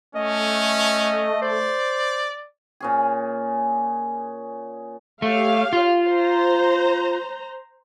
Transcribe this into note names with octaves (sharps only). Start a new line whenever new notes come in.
A3 C#4 D#5
C5 D5
A#2 C#4 G#4
A3 G4 C#5 F5
F4
C5 A#5